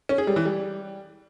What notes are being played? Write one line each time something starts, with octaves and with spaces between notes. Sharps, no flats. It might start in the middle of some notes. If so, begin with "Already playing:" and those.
C#4
G#4
G3
E3
G3